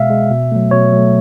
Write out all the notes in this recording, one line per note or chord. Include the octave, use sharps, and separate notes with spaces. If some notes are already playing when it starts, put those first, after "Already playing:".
Already playing: B2 G#3 E5 F5
G#3
B2
F#3 A3
B2 C#5
F#3 A3